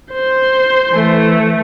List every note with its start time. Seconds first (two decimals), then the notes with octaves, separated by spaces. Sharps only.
0.13 C5
0.88 E3 A3